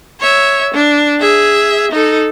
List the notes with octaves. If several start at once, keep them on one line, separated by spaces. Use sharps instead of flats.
C#5 E5
D4
G#4 E5
D#4 A4